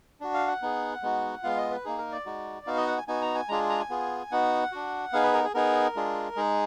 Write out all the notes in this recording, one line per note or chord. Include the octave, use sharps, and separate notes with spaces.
D4 F#4
F5
F#5
B3 D#4 G#4
G#3 B3 D#4 F#4
G#3 B3 F4 F5
D#5
B4
A#3 D#4 G#4
A#4
D5
G#3 D#4 F#4
B3 D#4 F#4 F5
D#5
F#5
G#5
B3 D#4 F#4 G#5
A#5
G#5
G#3 D4 F4 G#4 A#5
A#5
G#5
B3 F4 G#4
B3 D#4 F#4 F#5
D4 F#4
B3 D#4 G#4 F5
B4
A#4
G#4
B3 D#4 G#4 A#4
G#3 D4 F4 G#4
G#3 D#4 G#4